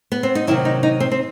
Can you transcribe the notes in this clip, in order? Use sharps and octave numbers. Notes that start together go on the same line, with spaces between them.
B3
C4
D#4
C3 D#3 F#3 E4
D#4
D#4
C4
C4